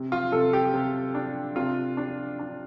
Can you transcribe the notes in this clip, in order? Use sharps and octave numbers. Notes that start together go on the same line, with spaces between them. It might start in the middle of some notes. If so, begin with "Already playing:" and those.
Already playing: C3
F4
C3 A4
G4
C3
D4
C3 F4
D4
D4